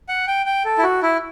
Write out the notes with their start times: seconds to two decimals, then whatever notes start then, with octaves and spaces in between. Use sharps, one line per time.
0.09 F#5
0.27 G5
0.46 G5
0.65 A4
0.78 E4
0.83 F#4
1.03 E4